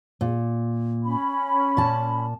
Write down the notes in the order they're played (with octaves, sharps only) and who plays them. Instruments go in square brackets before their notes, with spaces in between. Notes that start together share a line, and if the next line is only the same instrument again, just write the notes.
[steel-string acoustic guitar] A#2
[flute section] C#4 B5
[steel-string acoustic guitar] A#2 A5